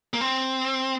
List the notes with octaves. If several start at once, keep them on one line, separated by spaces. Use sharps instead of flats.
A#3
C4